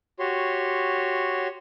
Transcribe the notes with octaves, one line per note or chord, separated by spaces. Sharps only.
F#4 G4 C#5 C6